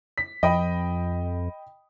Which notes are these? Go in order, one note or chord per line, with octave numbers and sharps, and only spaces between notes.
B6
F2 D#5 G5 B5